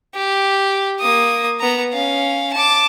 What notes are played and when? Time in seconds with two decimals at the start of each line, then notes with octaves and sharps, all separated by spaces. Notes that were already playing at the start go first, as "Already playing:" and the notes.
0.15 G4
1.00 A#3 D#6
1.61 B3 A#5
1.93 C#4 F5
2.53 A5 D6